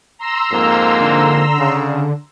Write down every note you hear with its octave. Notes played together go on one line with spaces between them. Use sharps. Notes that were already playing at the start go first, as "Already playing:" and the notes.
A#5 C6 E6
F2 G#2 A#3
D3
C#3